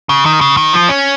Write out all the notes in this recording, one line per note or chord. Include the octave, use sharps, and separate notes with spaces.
C#3
D#3
C#3
D#3
F3
C#4